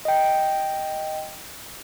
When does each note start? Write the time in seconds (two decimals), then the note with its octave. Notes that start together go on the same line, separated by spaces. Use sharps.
0.05 D#5 G5